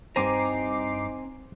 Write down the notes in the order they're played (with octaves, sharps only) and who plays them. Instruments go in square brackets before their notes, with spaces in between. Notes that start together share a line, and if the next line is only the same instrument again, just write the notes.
[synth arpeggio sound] G2 D6 C7 [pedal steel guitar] C4 G#5 A#5 [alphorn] D#4 [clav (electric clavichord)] C5